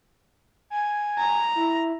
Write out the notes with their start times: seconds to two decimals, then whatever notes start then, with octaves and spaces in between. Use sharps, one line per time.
0.70 G#5
1.19 A#5
1.56 E4